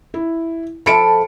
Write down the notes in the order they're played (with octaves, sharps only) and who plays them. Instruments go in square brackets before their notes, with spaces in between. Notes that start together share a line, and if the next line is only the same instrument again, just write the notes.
[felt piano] E4
[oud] F3 A4 E5 [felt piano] B5 C#7 D7